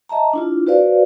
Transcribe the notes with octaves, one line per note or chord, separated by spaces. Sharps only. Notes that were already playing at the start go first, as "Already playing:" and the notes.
D#5 E5 A5 A#5
D4 E4 F4
F#4 B4 C5 D5 F5